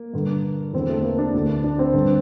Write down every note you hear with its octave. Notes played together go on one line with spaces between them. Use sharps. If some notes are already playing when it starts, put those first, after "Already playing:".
Already playing: A#3
G2 D3
E2 D3 C4
A3
A#3
D4
D2 D3
D4
C4
G2 D3